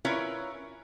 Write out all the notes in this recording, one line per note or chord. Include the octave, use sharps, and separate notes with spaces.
C#4 E4 F4 A#4 B4 C#5